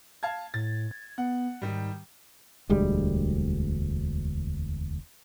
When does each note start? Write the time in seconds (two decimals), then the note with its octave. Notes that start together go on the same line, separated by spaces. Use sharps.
0.23 F5 A5 G#6
0.54 A2 A6
0.91 G#6
1.18 B3 F#5
1.62 G#2 D#3 G3
2.70 E1 D2 G3 G#3